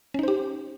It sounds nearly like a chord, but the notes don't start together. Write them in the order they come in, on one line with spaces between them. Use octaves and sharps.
C#4 D#4 C5 G4